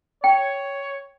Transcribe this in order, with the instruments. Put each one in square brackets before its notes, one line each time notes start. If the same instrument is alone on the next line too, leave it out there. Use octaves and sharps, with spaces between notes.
[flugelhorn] C#5 [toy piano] G5